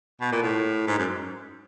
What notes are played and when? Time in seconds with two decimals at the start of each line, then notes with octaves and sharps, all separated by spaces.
0.21 B2
0.32 A#2
0.42 A2
0.87 G#2
0.98 F#2